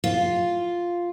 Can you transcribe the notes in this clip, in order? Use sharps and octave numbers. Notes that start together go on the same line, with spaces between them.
F4